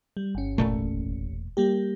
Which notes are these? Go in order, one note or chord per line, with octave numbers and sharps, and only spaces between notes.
G3
G1 C#4
E1 A#2 A3
G3 A#3 G4